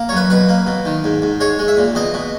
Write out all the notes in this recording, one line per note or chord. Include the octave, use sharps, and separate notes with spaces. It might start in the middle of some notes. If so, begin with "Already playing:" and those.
Already playing: A#3
C#5
F#2 B4
B2 B4
A#3
B2
D#3
G#2
G#2
G#3 C#5
G#3
E5
A#2
B2 D#5
B2